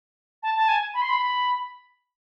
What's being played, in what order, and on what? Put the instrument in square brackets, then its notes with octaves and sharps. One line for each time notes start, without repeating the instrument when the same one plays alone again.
[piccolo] A5
A5
G#5
B5
C6
B5